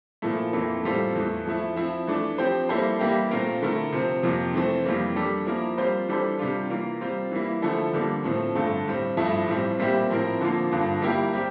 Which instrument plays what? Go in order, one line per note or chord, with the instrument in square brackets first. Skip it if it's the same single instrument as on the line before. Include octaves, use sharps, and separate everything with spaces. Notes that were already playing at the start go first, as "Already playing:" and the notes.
[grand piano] A#2 F3 A3 E4
F2 E3 A#3 E4 A4
A2 G3 C4 F4 A4
E2 E3 A3
F3 A3 E4
F3 C4 E4
E3 A3 D4
F3 C4 G4 C5
G3 A#3 E4 A4 C5
E3 G3 A#3 E4 G4
A#2 A3 C4 F4 A#4
D3 A3 E4 A#4
C3 F3 C4
F2 C3 F3 A#3
E3 A3 C4
F2 E3 G3 A#3
G3 D4 A4
F3 A#3 E4 A#4
G3 C4 F4 C5
E3 G3 D4 A4 C5
C3 G3 D4 F4
E3 A#3 F4 A#4
G3 C4 F4
E3 G3 A#3 E4
D3 F3 A3 E4 A4
D3 G3 A#3 D4
A2 F3 A3 C4
G2 D3 A3
A2 G3 C4
G2 F3 A3 E4
A2 E3 G3 C4
A#2 G3 C4 E4 G4
A2 F3 C4 E4 A#4
D3 F3 A#3 F4
G2 D3 F3
G3 A#3 E4 G4 A#4
G3 C4 G4